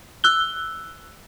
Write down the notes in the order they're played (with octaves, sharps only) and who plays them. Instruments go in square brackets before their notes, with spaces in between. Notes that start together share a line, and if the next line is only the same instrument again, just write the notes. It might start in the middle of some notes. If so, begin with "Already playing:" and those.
[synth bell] E6 F#6 G7